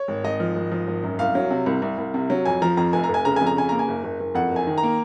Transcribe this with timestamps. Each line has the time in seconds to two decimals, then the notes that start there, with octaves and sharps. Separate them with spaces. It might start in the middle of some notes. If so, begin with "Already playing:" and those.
Already playing: C#5
0.08 G#1
0.24 G#1 D#5
0.40 F3
0.56 G#1
0.72 F3
0.87 G#1
1.04 F#2
1.19 C2 F5
1.35 F#3
1.51 C3
1.66 C2
1.82 C2
1.98 C2
2.14 C3
2.30 F#3
2.46 F2 G#5
2.62 F3 A#5
2.77 F2 A#5
2.93 F1 G#5
3.04 A#5
3.09 F1
3.14 G#5
3.25 C#3 A#5
3.36 F2 G#5
3.47 A#5
3.56 C#3 G#5
3.69 A#3 A#5
3.79 G#5
3.88 F#1
4.04 F#1
4.20 F#1
4.35 F2 F#5
4.51 F#1
4.56 G#5
4.67 D#3
4.78 A#5
4.83 A#3